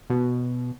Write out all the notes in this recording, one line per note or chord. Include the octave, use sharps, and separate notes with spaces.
B2